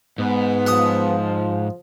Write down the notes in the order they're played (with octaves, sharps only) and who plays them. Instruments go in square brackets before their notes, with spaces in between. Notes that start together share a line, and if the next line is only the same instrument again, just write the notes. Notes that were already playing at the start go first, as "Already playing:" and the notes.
[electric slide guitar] G#2 [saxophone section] B3
[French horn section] F3 [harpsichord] F#5 D#6